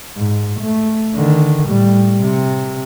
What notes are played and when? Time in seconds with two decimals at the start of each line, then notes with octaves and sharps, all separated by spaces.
0.17 G#2
0.60 A3
1.15 D3 D#3
1.68 A2 G3
2.22 C3